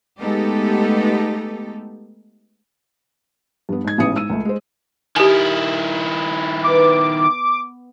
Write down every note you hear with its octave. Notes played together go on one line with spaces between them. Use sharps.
G#3 A3 B3 D#4 G4 A4
G2 B3
G#2 G#6
A1 G#2 C#3 B3 D#6 C#7
G#2 E6 D#7
C#2 A3
G#3 C5
D#3 E4 G4 G#5
B3 D6